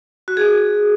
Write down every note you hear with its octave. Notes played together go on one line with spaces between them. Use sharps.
F#4
G#4